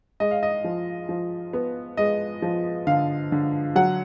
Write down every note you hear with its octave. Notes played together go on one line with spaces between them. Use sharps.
G#3 D#5
F5
D#5
F3
F3
B3
G#3 D#5
F3
D3 F5
D3
F#3 F#5